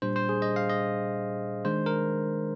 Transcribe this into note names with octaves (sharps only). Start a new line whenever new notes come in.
A#2 G3 D4 C5
C5
G#4
D#5
F5
D#5
D#3 G#3 D4 C5
A#4